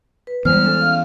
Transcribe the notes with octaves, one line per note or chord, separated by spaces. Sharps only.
B4
E3 G3 G#3 B3 C5 F6
C#4 A4
F5